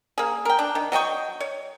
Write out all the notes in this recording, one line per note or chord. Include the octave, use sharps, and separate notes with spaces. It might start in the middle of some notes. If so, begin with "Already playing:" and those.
A#3 G#4
A#4 G5
D4
D#3
F#3 D#5 G5 C#6
C#5